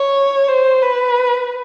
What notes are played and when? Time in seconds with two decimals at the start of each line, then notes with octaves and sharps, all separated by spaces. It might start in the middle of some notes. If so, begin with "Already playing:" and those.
Already playing: C#5
0.49 C5
0.82 B4